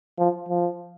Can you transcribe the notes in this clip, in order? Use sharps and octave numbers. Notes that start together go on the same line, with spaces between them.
F3
F3